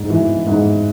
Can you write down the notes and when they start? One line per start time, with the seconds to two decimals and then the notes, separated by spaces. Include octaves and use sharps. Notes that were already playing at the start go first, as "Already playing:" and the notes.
Already playing: G#2
0.10 E3
0.47 G#2